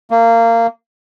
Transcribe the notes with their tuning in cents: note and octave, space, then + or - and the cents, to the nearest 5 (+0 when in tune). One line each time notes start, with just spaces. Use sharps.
A#3 -20